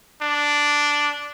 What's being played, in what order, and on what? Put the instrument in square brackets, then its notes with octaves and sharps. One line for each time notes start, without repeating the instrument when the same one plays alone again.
[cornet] D4